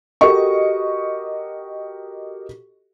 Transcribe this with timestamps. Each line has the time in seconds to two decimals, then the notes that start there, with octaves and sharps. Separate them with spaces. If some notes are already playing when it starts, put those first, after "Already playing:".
0.21 F#4 G4 A4 A#4 D#5 C#6